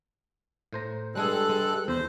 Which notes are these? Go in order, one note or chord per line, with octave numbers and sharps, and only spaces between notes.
A2 C5 A#5
G2 G3 G#3 G#4 A4 F#6
G#3
E2 C5